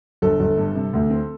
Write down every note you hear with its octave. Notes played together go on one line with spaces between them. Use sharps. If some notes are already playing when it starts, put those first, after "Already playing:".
G1 A4
G1
G2
C3
D2
C4